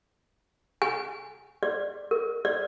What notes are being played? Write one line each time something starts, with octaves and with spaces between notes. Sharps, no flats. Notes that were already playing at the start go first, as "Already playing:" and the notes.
G#5
D5
A#4
D5